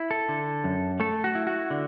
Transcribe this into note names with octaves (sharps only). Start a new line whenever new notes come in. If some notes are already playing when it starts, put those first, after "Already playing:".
Already playing: E4
A4
D3
F#2
A3 A4
F#4
E4
F#4
D3